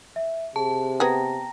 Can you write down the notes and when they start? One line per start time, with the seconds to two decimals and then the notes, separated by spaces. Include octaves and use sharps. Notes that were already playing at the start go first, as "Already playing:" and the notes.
0.16 E5
0.56 C3 G#4 A5
1.00 B3 G#4 G5 A#5 A#6